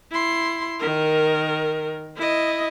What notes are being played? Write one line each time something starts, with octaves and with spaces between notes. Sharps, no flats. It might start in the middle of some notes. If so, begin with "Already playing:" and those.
E4 C6
D#3 A#4
E4 D#5